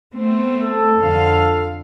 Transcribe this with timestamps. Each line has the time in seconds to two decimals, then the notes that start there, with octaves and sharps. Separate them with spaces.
0.14 A3 B3 C4
0.61 A4
0.97 F2 D3 F5